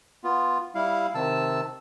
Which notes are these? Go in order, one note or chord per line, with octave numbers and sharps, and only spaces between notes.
B3 F4
G3 E4 F5
C3 D#3 A5 E6